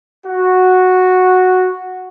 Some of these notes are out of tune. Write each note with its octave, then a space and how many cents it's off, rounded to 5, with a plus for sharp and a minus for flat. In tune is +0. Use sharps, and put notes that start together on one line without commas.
F#4 -5